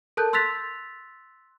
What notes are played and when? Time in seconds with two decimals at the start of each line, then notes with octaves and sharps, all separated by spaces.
0.17 A4 A#4 A5 F#6 G6
0.33 C6 E6 F#6 A6 B6 F7